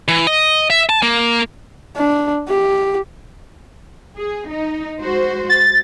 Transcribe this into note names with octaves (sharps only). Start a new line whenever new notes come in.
E3
D#5
E5
A5
A#3
D4
G4
G#4
D#4
G#3 F#4 C5
A6